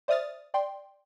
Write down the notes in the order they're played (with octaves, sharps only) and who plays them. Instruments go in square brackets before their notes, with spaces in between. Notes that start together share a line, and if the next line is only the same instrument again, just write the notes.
[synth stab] C5 D5 E5 D#6 F6 A6
D5 G5 C6